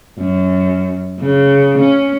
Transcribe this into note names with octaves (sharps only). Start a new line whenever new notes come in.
F#2
C#3
C#4